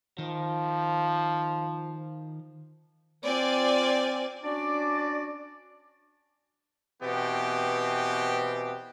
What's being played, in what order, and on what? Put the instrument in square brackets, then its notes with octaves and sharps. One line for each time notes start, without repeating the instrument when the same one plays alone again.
[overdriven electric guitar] D#3 [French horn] F3
[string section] C4 F4 D5 G#5
[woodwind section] C#4 D4 F#4 D5
[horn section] B2 E3 B3 C4 G4